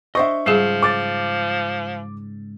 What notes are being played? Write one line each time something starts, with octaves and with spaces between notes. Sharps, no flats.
D4 C5 D#5 E5 C#6
G#2 C#3 F3 G3 G#4
D6 A6